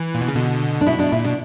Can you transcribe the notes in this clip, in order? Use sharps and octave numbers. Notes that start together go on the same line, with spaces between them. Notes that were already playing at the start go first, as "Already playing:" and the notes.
Already playing: E3
A#2
B2
C#3
B2 D3
D4
B2 E4
B2 D4
A#2 E4
B2 D4